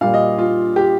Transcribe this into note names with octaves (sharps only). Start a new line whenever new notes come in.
A#2 G3 F5
D#5
F4
G4